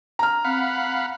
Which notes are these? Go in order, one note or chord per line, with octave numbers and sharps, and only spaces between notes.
A#5 F6
C4 F5 F#5 B5